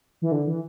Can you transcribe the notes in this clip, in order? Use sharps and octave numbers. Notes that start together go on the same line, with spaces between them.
E3
D3
E3